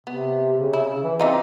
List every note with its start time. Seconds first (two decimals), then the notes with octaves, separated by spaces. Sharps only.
0.07 C3 B3
0.58 C#3
0.73 E4
1.04 E3
1.20 E3 C4 D#4 F4